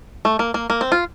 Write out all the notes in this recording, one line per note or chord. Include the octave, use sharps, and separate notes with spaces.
A3
A#3
A#3
A#3
C4
F4